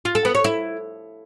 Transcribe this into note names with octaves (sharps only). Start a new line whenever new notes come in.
F4
A4
B3
C#5
E4